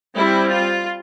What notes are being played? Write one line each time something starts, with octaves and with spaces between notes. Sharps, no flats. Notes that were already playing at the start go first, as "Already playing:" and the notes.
G3 C4 E4
F4